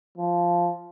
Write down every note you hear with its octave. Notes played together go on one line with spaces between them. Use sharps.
F3